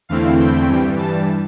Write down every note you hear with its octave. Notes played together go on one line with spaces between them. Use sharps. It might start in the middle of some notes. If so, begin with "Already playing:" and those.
E2 D3 A3 C4 E4 F5
G5
G2 E3 G3
A5